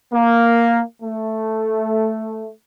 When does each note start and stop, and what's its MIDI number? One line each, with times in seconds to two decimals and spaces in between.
0.14 0.81 58
1.02 2.51 57